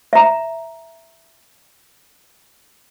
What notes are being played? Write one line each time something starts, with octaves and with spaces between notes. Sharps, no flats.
E5 A#5